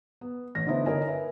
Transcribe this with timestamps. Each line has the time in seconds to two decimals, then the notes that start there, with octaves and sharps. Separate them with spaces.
0.21 B3
0.55 A1 A#6
0.67 D3 B3 D#4 E4 C5
0.86 D#4 A#4 C#5 G#5
1.08 B4 E5